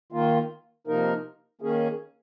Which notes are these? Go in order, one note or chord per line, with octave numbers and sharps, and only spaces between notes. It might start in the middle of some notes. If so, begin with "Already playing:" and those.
D#3 A#3 F4
C3 F3 A#3 D#4 A#4
D#3 A#3 C#4 G#4